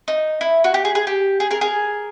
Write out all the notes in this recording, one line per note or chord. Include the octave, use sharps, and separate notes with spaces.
D#4
E4
F#4
G4
G#4
G#4
G4
G#4
G#4 A#4
G#4 A#4